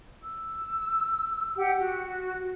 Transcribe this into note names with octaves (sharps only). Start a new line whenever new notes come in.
E6
G4 F#5 G5
F#4